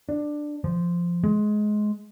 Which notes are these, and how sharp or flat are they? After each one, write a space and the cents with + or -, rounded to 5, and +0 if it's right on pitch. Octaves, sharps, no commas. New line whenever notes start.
D4 +10
F3 -10
G#3 +20